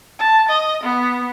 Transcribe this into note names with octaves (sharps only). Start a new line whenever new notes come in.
A5
D#5
B3